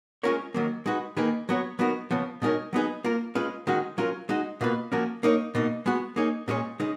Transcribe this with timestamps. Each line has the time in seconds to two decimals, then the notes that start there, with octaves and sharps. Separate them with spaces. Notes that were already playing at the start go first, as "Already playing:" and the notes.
0.23 G#3 C#4 F4 A#4 C#5
0.54 D#3 F#3 A#3
0.86 G#3 D#4 F#4 B4
1.17 D#3 A#3 D#4 G#4 B4
1.49 F#3 B3 F#4 C#5
1.79 F#3 B3 D#4 F#4 A#4
2.11 C#3 F3 B3
2.42 B2 G#3 D#4 A#4 C#5
2.73 F#3 B3 D#4 G#4 B4
3.04 A#3 F4 A#4
3.35 G#3 C#4 F4 B4
3.67 D#3 G#3 C#4 F#4
3.98 F#3 C#4 F4 A#4
4.29 G#3 D#4 F#4
4.61 B2 A#3 F4 B4
4.92 F3 A#3 C#4 F#4 A#4
5.23 A#3 D#4 A#4 C#5
5.55 B2 A#3 D#4
5.86 G#3 B3 F#4
6.16 A#3 D#4 G#4 C#5
6.48 A#2 G#3 C#4 G#4 C#5
6.80 C#3 G#3 D#4